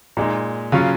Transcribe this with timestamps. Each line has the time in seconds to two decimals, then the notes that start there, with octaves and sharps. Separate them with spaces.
0.17 A#2 G#3 D#4
0.72 C#3 F#3 C#4 F4